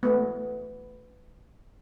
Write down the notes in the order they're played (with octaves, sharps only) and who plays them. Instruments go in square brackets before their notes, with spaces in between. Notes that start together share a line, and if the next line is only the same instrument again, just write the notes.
[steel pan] A3 B3